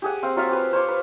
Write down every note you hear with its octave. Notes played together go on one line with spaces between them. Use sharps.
G4 G#4 F#5
C4 F5
F#3 F4 E5 F5
G4 B4
C5 C#5 D6
B4